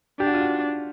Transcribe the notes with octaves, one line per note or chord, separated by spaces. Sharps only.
D4 G4
F#4
F4
F#4